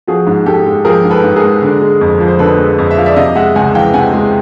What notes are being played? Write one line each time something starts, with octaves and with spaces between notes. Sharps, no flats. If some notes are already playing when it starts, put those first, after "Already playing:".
F3 F#4 G#4
G#2
G#2 G4 A4
G#3
F3 G#4 A#4
G#2
A4 B4
G#2
G#4 A#4
G#3
D3
G#3
F2
F3
C5
D3 A4 B4
G#3
F2
E5
F3 F5
D5 E5
C3 D#5 F5
G#3 E5 F#5
C#2 F#5 G#5
E3 F5 G5
C3 F#5 G#5
G#3